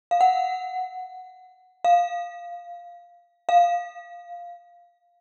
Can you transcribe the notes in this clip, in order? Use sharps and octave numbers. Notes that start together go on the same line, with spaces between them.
F5
F#5
F5
F5